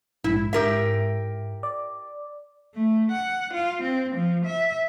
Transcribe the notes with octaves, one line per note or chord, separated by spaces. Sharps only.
A#1 G#2 E4
G#2 G4 A#4 E5
D5
A3
F#5
F4
C4
F3
E5